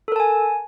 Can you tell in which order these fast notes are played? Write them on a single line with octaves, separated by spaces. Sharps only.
A4 A#4 A5 G#5